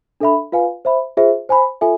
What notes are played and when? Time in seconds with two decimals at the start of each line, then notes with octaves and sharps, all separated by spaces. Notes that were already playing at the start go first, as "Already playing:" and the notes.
0.20 D4 A4 E5 B5
0.52 F4 B4 F5 G#5
0.85 C5 E5 B5
1.17 F4 G#4 C5 E5
1.49 C5 G#5 B5
1.81 F4 A4 E5 G#5